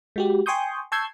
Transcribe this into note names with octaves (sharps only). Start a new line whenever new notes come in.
G#3 F#4 G4
G5 G#5 C6 C#6 D#6 G6
A5 C#6 E6 G6 G#6 C7